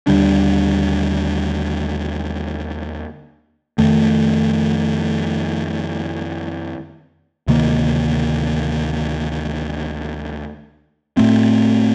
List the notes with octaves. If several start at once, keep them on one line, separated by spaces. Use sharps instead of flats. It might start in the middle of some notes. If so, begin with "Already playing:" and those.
D#2 D3 G3 D4
F2 D#3 A3
D2 C3 D#3 A#3
A2 A3 C4